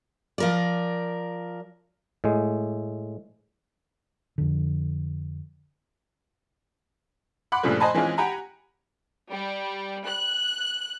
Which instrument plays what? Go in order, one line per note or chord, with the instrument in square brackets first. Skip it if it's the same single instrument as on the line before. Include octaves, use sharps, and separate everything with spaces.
[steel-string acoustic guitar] F3 A#4 D5
[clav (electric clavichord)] A2 G#3
[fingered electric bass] F2 D3
[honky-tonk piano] F#5 B5 C6 D6 F#6
G2 A#2 C#3 F3 G3 A3
C5 D#5 G#5 A5 B5 C6
E3 G#3 C4 C#4 F4 G#4
G4 F#5 G#5 A#5 B5
[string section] G3
F#6